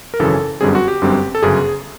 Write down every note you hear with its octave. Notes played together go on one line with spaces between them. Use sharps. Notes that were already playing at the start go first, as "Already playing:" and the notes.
A#4
G#1 F#2 C#3 E3 A4
G1 F#2 D3 G3 C4 G#4
F#4
G4
G1 F#2 D3 G3 C4
A4
G1 F#2 C#3 G#4